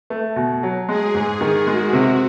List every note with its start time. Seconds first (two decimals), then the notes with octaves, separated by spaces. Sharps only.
0.10 A3
0.36 B2
0.63 F#3
0.88 G#3 G#4
1.15 G#2
1.41 D#3
1.66 G#3 F#4
1.93 C3